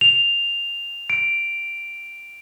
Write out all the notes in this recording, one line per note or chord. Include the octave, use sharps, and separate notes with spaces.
F7
D7